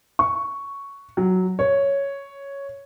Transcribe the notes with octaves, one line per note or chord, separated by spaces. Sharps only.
C#6
F#3
C#5